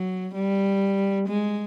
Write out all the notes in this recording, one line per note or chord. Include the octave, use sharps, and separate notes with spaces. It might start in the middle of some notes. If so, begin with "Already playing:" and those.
Already playing: F#3
G3
G#3